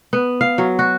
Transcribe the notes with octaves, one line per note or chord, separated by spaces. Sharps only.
B3
F5
F#3
F#4